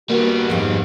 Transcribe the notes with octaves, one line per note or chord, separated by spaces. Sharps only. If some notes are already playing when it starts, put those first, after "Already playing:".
G3 A#3 B3 F#4
F2 G#2 G#3